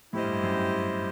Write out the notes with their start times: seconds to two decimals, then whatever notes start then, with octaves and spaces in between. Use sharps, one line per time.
0.13 A2 E4 G4 C5 D#5
0.23 G2
0.33 G2
0.43 F#2